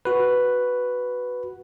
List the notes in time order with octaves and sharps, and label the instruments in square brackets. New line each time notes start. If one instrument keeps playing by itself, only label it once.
[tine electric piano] F#4 B4